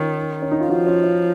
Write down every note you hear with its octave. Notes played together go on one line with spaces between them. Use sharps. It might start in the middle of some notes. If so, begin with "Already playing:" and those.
Already playing: D#3 C#4 F4
C#4
D#4
F4
F3 D#4 F#4
C#4 F4
C#4 F4